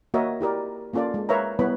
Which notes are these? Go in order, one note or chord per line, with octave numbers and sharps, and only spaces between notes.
A#3 F#4 A#4 C#5 D#5 E5
E4 G4 A#4 D5
A#3 C#4 F4 A4 D5
G#3
A#4 B4 C#5 E5 F5 A#5
G3 B3 E4 B4 C#5 B5